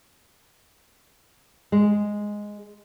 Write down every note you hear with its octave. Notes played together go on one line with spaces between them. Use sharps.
G#3